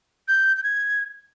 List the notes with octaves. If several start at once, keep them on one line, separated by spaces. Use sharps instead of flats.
G6
G6
G#6